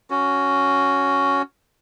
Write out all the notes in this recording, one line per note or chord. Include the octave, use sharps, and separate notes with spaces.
C#4 F#4